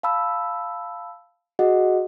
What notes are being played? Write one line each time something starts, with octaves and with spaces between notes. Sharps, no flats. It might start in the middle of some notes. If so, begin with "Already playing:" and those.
F5 A5 B5 E6
F#4 G#4 D#5 F#5